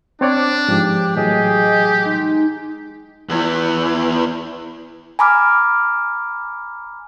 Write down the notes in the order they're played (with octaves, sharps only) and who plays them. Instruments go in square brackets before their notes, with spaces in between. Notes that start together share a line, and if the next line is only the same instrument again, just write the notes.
[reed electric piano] C4 C#5 D5 [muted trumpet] D4 [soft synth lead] D6
[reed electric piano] G#2 F3 [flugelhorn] G4
[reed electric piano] A2 E3 F#3 [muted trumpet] G4 [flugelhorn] G#4 [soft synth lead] D#5
[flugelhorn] G#3 [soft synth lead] D#4
[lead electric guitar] E2 E3
[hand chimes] G#5 A#5 B5 D6 F6